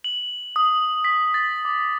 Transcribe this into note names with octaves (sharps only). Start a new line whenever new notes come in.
F#7
D#6
B6
A6
D6